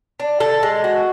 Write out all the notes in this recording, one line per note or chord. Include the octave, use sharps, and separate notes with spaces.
D4
A4
G#3
F#4